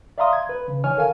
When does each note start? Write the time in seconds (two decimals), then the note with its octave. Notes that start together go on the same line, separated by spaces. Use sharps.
0.18 D5 E5 F5 A#5 C6 D#6
0.33 G#6
0.47 D#2 B4
0.68 C#3
0.84 D#3 C#5 G#5 F6
0.98 A4 A#4 F5 G#5